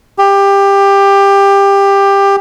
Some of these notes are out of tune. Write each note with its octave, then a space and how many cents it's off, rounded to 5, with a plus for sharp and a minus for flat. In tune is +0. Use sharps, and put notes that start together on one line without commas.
G4 +20